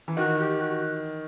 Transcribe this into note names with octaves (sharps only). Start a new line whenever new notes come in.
E3
D#3 F#4
G4
F#4